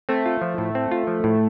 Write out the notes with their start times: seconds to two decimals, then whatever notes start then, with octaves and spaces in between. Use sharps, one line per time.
0.09 A3 C4
0.26 F4
0.42 F3
0.58 A2
0.75 C4
0.91 F4
1.07 F3
1.24 A2